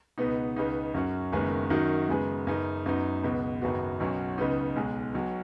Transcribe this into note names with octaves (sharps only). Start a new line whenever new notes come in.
C#2 B2 B3 D#4
C#2 C#3 B3 D#4
F#2 F#3 C#4 F#4
F#1 F#2 D#3 G#3 B3
F#2 D#3 F#3 D#4 F#4
F#2 C#3 G#3 B3
F#2 C#3 B3 D#4
F#2 F#3 B3 D#4
C#2 B2 B3
G#1 F#2 C#3 B3 F#4
B1 B2 F#3 C#4
C#2 C#3 B3 D#4
B1 B2 G#3
B1 B2 F#3